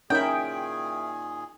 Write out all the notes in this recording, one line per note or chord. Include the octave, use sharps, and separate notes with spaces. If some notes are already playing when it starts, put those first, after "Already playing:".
A#2 D#3 C#4 D#4 E4 G#4 A#4 G5